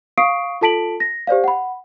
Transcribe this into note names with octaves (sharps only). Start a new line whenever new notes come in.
F5 C#6 D#6 C7 D7
F4 A4 A5 B6 D7 F#7
A#6
G4 C5 D5 F5
F#5 B5